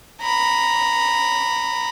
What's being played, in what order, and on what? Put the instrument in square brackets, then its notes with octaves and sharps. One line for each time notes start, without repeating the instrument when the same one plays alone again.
[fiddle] A#5 B5